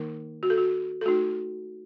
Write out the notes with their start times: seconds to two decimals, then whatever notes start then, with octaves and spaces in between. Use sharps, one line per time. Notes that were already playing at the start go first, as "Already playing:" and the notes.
Already playing: D#3 A#3 D#4 A#4
0.43 F#4
0.50 A4
0.58 F#4
1.01 A4
1.05 A3 D#4 F#4